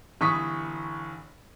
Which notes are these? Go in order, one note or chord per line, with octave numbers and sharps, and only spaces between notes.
G1 E3 C#6 D#6 B6